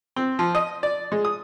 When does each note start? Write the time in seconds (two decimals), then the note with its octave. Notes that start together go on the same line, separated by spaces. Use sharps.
0.16 C4
0.39 F3
0.55 D#5
0.83 D5
1.12 G#3
1.25 D#6